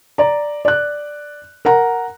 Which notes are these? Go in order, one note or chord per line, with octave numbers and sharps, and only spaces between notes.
D5 A#5
D5 F#6
A#4 F#5 A#5